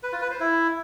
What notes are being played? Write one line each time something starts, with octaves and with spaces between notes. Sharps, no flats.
B4
F4
B4
C5
E4